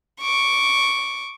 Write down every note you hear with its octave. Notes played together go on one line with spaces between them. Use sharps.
C#6 D6